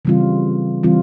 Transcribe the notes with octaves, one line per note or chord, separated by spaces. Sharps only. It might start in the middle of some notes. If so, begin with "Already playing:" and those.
C#3 E3 G3 C4 F4
C#3 E3 G3 C4 F4